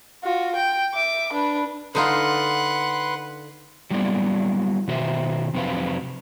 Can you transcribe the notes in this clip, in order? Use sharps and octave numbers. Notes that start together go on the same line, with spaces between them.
F4 F#4
G5
E5 D6
D4 B4
D3 D#4 F4 B4 F#5 C6
F#3 G3 A#3 B3 E4 D5
B2 D#3 F#4 C5 E5
F2 C3 F#3 C4 B4 F5